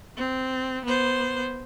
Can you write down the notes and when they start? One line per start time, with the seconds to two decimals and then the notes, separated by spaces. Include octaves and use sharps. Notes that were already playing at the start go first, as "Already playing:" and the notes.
0.17 C4
0.85 B3 C5